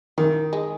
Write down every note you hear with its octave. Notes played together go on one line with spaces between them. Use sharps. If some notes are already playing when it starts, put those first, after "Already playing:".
D#3 E3
G#3